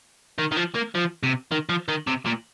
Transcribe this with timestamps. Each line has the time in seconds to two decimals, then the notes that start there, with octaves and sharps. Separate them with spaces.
0.38 D#3
0.52 D#3
0.57 F3
0.76 A#3
0.95 F3
1.23 C3
1.52 D#3
1.69 F3
1.88 D#3
2.07 C3
2.26 A#2